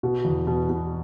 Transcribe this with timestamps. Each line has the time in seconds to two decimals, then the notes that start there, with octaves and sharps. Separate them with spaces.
0.03 B2 F#4
0.25 E2
0.47 B2
0.69 B2